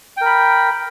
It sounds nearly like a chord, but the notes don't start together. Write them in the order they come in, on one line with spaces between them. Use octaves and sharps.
G5 A#4 B5